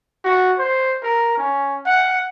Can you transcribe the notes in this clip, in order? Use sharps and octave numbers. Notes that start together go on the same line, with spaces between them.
F#4
C5
A#4
C#4
F#5